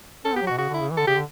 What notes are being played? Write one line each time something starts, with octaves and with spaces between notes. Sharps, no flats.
C#4 A4
B3 G4
F#3
F#4
B2
C#3 F#4
D3
E4
C#3
E3
D3 A4
C#3 G4
D3